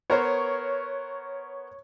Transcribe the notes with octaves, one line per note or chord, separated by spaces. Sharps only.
B3 A#4 C5 C#5